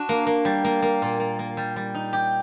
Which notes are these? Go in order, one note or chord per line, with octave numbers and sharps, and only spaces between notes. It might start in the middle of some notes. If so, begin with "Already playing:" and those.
Already playing: D4 F#4
A#3
A#3
G3
A#3
A#3
A#2
A#3
A#3
G3
G3
D#4
G4